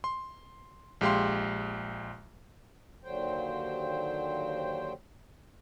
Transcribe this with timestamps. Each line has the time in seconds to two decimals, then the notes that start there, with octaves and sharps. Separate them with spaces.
0.04 C6
1.01 A#1 G#3 G4 F5 C6
3.04 D#2 D3 F#3 C5 G5